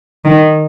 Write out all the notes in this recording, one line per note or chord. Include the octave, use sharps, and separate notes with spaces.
D#3